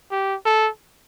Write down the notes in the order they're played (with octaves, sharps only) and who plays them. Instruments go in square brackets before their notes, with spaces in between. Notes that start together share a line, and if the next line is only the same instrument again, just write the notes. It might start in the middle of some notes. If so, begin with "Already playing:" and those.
[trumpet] G4
A4